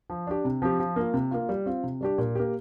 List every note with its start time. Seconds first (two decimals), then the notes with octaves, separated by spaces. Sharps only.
0.10 F3
0.27 D4 G4
0.45 C3
0.62 F3 C4 G4
0.79 F3
0.96 A#3 F4
1.14 C3
1.31 A#3 F4
1.49 G3
1.66 C4 F4
1.83 C3
2.01 G3 D4 G4
2.18 A#2
2.35 A#3 G4